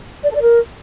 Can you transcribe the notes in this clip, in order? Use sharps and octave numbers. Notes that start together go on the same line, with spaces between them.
D5
A4
D5
A#4